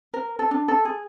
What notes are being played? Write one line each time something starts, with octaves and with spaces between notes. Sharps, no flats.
A#4
A4
D4
A4
G#4